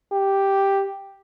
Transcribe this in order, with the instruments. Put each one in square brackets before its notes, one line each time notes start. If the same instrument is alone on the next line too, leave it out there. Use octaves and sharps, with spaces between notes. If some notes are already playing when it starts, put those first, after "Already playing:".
[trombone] G4